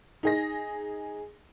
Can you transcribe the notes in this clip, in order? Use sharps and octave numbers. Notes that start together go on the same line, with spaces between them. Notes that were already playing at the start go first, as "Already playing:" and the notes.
D#4 G#4 A#6